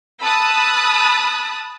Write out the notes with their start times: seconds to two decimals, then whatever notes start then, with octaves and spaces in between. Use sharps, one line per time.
0.22 A5 B5 D#6 E6 F#6 A6